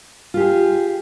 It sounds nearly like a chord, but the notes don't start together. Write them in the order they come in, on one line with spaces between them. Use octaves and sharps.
F4 G4 G#4